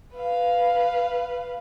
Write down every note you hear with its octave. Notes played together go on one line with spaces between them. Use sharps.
B4 F5